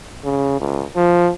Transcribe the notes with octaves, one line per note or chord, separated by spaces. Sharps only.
C#3
C#2
F3